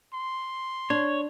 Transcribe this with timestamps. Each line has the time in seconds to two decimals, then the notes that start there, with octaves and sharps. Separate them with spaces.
0.14 C6
0.90 D4 C#5